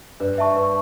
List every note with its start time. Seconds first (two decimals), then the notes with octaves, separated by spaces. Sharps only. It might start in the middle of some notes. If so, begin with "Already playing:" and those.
0.20 G2 B4
0.38 E5 A5 C#6
0.56 B4